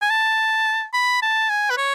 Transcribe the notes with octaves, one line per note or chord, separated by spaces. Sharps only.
G#5
A5
B5
A5
G#5
B4
C#5